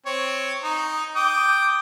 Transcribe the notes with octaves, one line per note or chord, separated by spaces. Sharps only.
C4 C#5
D#4
G5 D6 D#6